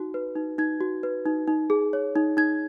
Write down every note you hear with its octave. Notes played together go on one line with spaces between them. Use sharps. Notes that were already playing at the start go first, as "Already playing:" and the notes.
Already playing: D#4 F#4
B4
D#4
D#4 G#6
F#4
B4
D#4
D#4
G#4
C#5
D#4
D#4 G#6